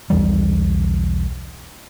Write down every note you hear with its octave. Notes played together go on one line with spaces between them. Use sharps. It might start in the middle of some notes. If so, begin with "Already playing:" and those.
B1 E2 E3 G3